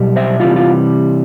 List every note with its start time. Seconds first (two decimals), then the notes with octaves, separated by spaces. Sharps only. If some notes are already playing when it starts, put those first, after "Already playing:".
Already playing: B1 B2 G3
0.16 C5 E5
0.40 C3 E3 G3 F4
0.56 F4